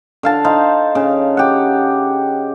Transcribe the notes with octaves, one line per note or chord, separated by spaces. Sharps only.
D3 F5 A5
D#4 C5 F5
C#3
G4 F#5